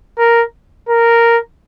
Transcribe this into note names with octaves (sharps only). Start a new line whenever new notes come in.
A#4
A#4